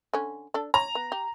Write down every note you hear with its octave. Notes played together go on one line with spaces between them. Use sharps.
D3 C#4
D4 A4
C#5 A#5
B3
G4